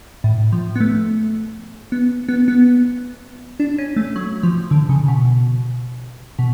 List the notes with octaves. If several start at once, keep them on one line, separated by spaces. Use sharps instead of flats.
A2
F3
B3
A3
B3
B3
B3
D4
C#4
A3
F#3
F3
D3
C#3
B2
B2